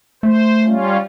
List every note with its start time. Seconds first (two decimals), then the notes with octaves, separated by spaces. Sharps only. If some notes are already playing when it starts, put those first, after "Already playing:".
0.23 A3 C5
0.66 G3 C#4 F4